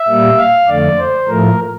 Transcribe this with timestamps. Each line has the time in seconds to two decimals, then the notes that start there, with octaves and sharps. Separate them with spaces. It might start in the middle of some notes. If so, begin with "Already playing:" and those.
Already playing: E5
0.08 A#2 G3 A#3
0.38 F5
0.68 F2 D3 A3 D5
0.99 C5
1.28 A2 F3 A3 A#4